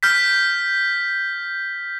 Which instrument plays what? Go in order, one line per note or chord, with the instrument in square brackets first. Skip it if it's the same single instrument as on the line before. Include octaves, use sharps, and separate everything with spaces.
[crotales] F6 G6 B6